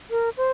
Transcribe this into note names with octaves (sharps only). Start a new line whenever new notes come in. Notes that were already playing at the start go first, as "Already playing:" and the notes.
A#4
C5